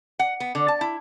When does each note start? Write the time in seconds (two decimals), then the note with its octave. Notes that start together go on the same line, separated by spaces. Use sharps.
0.19 F#5
0.40 B3
0.55 D3
0.68 A5
0.81 E4